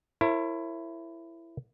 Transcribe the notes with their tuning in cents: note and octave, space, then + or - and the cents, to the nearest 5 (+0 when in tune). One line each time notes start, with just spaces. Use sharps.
E4 +15 A#4 -35 C#5 -40